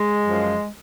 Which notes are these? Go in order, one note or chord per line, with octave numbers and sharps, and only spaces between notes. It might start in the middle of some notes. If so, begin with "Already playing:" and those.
Already playing: G#3
F#2 F3